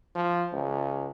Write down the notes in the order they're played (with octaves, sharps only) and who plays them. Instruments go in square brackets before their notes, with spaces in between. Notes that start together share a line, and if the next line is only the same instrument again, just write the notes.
[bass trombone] F3
C#2